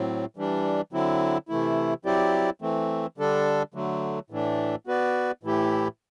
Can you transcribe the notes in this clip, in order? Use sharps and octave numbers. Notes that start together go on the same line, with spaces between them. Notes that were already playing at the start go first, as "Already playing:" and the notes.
Already playing: A2 F#3 C4
E3 G3 D4
D3 F#3 C4 E4
C3 E3 A3 E4
F#3 C4 E4 G4 D5
E3 A3 C4
D3 G3 D4 A4
D3 F#3 A3
A2 E3 A3 D4
B3 F#4 B4 D5
A2 E3 A3 E4 G4